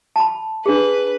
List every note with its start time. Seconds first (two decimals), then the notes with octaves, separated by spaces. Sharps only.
0.16 A5 B5
0.66 D4 G#4 B4